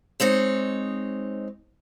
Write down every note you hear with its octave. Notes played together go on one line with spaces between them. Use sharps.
G#3 C4 D#4 C#5